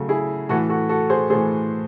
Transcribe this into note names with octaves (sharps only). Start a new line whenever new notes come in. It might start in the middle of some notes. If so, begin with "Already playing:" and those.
Already playing: C#3 F#3 A3
E4 G#4
A2 E3 A3 F#4 A4
F#4 A4
F#4 A4
G#4 C5
A2 E3 A3 G#4 C5